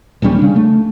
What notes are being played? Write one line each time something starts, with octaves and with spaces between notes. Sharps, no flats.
D#1 D#2 G3 C#4
C#3 D4
A3